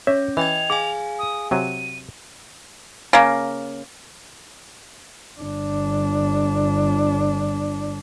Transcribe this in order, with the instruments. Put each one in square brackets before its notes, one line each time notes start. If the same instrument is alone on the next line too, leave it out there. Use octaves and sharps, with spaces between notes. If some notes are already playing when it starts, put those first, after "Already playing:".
[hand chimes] C#4 [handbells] C#5 [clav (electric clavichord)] E5
[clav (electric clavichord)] E3 [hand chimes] D#5 G5 G#6 [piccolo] F7
[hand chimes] G#4 F5 G#5 [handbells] D6
[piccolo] D#6
[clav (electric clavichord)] C3 F#3 [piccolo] D#7
[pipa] C#3 A#3
[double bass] G1 D4